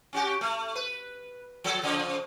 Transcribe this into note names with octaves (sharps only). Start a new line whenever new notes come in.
C#4 F#4 G4
A3
B4
F3 A4
C#3 F3